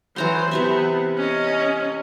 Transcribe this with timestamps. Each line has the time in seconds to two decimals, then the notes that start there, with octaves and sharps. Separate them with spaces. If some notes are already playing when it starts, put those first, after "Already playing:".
0.16 E3 F#3 C5 A#5 C6
0.51 C3 E3 B3 E5
1.17 C#4 D#5